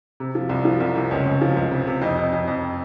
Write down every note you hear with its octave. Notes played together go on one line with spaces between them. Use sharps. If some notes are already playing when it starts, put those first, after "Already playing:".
C3
F3
C2
F3
C2
C3
C#2 C#4
C#2
F3
C#2
C3
C3
F2 D#4
F2
F2
F2